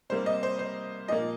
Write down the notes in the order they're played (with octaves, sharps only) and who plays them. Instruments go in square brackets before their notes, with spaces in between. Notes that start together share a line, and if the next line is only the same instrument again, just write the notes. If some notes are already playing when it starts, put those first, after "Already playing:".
[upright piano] C3 G3 A#3 C5
D#5
C5
C5
A#2 F3 A#3 D#5